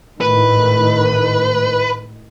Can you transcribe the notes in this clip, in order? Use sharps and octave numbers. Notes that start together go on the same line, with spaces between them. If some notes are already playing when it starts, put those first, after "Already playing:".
G#1 A2 D#3 B4